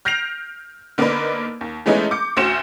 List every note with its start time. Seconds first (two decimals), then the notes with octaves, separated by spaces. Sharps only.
0.05 F6 G6 A#6 C7 D7 F7
0.98 D3 A#3 B3 D4 D#4 B4
1.61 D#2
1.86 E3 G#3 A3 B3 C#4 D#4
2.11 D6 G6 C#7
2.37 A1 D2 F#4 C5 C#7 E7